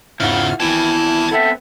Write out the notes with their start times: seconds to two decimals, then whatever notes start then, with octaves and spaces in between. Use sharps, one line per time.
0.20 E2 G#2 C#3 E4 F4 F#5 F6
0.60 G#1 E2 E3 E4 G5 A5 G#6
1.32 B3 C4 A4 E5